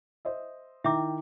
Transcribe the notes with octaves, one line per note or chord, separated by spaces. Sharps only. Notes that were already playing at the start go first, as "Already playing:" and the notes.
C5 D#5 E5
D#3 E4 E5 G5 A#5 D6